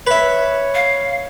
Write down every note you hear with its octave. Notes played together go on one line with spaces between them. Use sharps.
B4 C#5 E5
F5